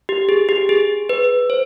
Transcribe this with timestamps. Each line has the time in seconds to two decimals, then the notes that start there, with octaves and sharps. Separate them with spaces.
0.09 G4
0.29 G#4
0.49 G4
0.69 G#4
1.09 B4
1.50 C5